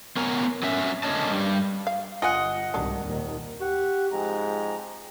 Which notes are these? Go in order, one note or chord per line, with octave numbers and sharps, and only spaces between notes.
B3 A#4 C#5 G#5 A#5
F#3 C#4 E5
D3 A#3 C#4 C#5 D#5 A5
G2 G3
F5
G1 F4 D#5 F#5 G#5
C2 G#2 D#3 F#3 G3 D4
D#2 A#2 D#3
G4 F#5 C#6
G#2 F3 C4 A#5